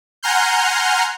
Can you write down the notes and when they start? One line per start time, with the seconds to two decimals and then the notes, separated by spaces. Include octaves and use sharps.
0.23 F#5 G#5 A#5 C6 F6 G6